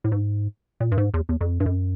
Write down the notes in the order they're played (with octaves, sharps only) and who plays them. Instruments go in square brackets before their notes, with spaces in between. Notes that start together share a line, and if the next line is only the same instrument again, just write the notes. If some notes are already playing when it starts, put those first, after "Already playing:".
[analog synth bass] A2
G#2
A#2
G2
G#2
E2
E2
F2
G2
F#2